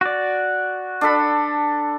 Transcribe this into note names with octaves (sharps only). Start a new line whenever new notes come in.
F#4 D5
D4 A4 B5